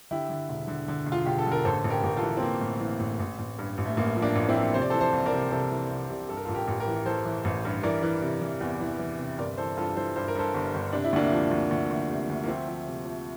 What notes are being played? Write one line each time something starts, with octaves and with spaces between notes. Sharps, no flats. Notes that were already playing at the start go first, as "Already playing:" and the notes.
D3 E4 G4
D3
E1
D3
D3
E1
F4
E1 G4
A4
D3
A#4
A1 A4 C5
A1
G4 A#4
A1 A#4
F4 A4
E3
C4
E3 A#3
A2
E3
A1
A1
A1
G2
A1
A3
A1 A#3
F3
A#3 D4
A1
C4 E4
F3
C3 C5
D5
A4 C5
E3
A4 C5
C2
A#4 D5
C3
C2 A4 C5
E3
C2
C3
G2 A4
A#4
F4 A4
A1
G4 A#4
A1
G4 A#4
E3
E3 A4 C5
E3
A1
G2
E3 A#4 D5
E3
C3
E3
E2
E3
E3
C3
G1 A#4 D5
E3 A4 C5
G2 F4 A4
E3 A4 C5
G2 C5
A#4
G2 A4 C5
G1
G1
C3 D4
E4
D2 A#3 D4
F3
D2
D2
D2
C3
D2
A#3
F3 A3 C4
F3
C3
F3